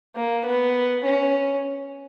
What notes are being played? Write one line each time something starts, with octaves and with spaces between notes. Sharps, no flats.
A#3
B3
C#4